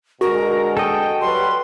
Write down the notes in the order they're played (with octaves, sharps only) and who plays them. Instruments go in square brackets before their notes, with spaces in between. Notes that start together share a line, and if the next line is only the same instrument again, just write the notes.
[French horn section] B2 D3 G#3 [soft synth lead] F#4 [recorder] A#4
[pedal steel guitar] A4 D#5 [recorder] G5
[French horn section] F#3 G3 B4 [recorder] C6